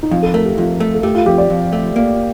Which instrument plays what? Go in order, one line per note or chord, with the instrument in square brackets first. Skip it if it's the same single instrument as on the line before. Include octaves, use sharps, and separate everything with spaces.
[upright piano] D#4
[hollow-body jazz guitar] F2 [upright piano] F4
[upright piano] A4
[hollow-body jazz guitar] A3 [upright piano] A#4
[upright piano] G4
[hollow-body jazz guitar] F2 [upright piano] F4
[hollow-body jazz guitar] A3
[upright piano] A4
[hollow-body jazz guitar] A3 [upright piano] G4
[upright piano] F4
[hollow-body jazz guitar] F2 [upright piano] G4
[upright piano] D5
[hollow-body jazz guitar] F2
A3
A#3